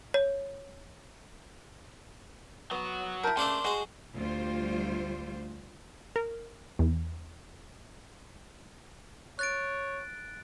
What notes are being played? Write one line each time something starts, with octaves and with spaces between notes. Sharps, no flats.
C#5
F#3 B3 F#4
E4 A#4 A5 G6
C#3 A3 A#3 D4 C5 C6
G#3 F#4 C5
D2 G3 F4 C5
A#4
E2
C#5 F#6 A6 D7